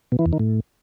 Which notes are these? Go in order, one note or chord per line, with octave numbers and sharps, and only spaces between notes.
B2
E3
E2
D#3
A2